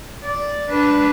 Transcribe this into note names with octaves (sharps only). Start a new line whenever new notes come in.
D5
D4 B4